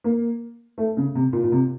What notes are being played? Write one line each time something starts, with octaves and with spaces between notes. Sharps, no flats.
A#3
A3
C#3
C3
A#2
A#2
C3